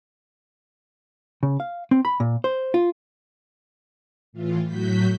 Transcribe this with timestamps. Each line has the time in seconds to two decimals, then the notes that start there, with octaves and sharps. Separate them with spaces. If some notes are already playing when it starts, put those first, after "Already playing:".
1.43 C#3
1.60 F5
1.91 C4
2.05 B5
2.20 A#2
2.44 C5
2.74 F4
4.33 A2 E3 F4
4.66 A2 F#3 F#4 G6 B6